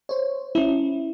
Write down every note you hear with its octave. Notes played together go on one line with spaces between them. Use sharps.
C5 C#5
C#4 E4